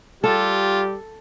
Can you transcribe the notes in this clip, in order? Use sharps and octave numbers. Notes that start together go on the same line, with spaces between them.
G3 F4 G4 A4